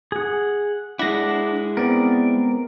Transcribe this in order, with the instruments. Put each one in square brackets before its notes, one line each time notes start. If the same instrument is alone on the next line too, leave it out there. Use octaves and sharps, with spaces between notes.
[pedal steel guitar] G#4 F#5
[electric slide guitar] G#3 E4 [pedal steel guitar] D4 [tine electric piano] F#5 A#6
[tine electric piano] B3 C4 [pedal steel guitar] A#4 D5